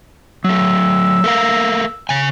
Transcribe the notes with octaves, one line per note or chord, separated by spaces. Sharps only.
F#3 A3 E6
A3 A#4 F5
C#3 G#5